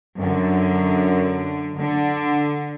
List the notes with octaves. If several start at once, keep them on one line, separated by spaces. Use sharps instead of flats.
F#2 D3
D3